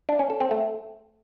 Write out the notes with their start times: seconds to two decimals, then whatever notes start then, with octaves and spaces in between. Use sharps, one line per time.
0.09 D4
0.19 C#4
0.30 A4
0.40 C4
0.51 A3